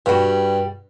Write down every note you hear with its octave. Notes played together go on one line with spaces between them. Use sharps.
G2 G3 F#4